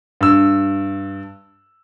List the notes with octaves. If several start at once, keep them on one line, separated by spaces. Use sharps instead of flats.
G2 E6